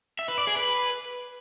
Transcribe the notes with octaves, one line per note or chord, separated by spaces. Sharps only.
E5
B4
D5
G#4
B4